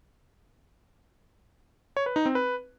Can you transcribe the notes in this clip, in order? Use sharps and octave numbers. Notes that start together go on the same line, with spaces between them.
C#5
B4
D#4
C4
B4